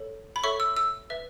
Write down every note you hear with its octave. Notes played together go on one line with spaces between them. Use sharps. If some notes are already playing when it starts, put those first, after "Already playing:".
Already playing: A4 C#5
B5
A4 C#5 E5 C#6
E6
E6
B4 E5